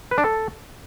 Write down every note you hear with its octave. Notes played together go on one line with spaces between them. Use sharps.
B4
D4
A4